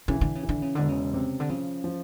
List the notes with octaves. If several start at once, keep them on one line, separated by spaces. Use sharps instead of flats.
C#3 E3
D3
C#3
E3
D3
C#3
E1 D3
C#3
C3
D3
C#3 F3
F3